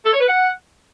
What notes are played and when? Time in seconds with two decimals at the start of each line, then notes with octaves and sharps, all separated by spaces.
0.05 A4
0.13 C#5
0.20 B4
0.28 F#5